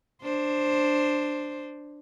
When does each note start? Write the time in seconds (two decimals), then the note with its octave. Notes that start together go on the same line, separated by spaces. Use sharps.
0.22 D4 C5